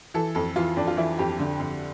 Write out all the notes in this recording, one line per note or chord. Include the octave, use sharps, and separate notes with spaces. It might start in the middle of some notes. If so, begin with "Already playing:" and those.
E3 A4
F2 A4
E3 F4
F2 D4
F4
E3 E4
F2 G4
D3
F2